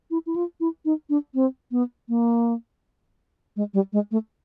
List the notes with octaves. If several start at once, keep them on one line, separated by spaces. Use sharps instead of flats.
E4
E4
F4
E4
D#4
D4
C4
B3
A#3
G#3
G3
G#3
A3